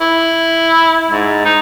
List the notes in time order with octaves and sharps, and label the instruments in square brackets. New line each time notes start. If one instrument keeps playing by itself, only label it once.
[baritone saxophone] E4
G#2
D#4